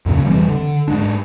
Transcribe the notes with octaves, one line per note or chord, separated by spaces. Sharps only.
F2 A#2 C#3 F3
E1 E3 G3 C4
D3
G#2 G#3 D4